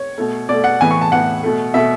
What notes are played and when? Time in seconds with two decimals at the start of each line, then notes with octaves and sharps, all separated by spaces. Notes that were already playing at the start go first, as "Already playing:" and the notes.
Already playing: C#5
0.18 B2 A3
0.49 B2 A3 D5
0.64 F#5
0.81 A2 E3 B3 G#5
0.91 C#6
1.01 A5
1.11 A2 E3 B3 F#5
1.43 B2 A3
1.74 B2 A3 E5